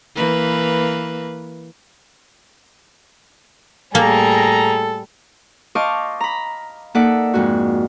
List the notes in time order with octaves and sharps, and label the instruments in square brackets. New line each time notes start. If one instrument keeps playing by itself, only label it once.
[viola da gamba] E3 A#3 B4
[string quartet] A2 G3 G#4 [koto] A#3 [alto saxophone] A4 [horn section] A#5
[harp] C5 D#5 F5 A5 C#6 D6
A#5 B5
A#3 D#4 A4 D5 E5 F#5
F2 G#2 F#4